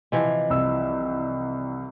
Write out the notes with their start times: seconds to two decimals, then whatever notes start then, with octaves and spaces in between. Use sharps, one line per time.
0.12 C3 E3 F3 D#5
0.50 C2 E6